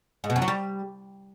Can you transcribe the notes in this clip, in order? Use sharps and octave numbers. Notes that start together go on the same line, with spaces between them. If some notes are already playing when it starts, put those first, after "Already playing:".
G#2
B2
F#2
F#3
G3